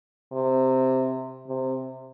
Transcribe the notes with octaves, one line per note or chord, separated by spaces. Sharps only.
C3
C3